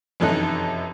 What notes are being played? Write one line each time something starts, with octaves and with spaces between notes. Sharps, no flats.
F1 F#2 E3 D#4 A4 F#6